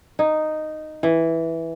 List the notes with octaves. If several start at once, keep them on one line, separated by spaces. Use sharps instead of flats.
D#4
E3